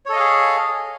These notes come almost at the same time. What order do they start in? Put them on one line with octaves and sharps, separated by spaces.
C#5 A4 D#5 F5 G#4